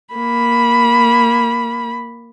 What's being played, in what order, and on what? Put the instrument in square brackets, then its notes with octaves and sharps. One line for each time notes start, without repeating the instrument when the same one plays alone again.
[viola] A#3 B5